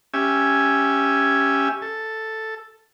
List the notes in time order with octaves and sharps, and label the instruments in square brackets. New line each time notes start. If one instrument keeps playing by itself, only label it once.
[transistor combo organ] C#4 G4 E5 G#5
A4